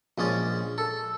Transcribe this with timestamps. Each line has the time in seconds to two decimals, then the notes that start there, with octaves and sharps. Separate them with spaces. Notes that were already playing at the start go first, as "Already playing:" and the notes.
0.18 A#1 G#3 C#4 D5
0.78 A4